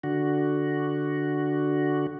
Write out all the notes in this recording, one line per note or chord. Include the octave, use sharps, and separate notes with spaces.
D3 F#4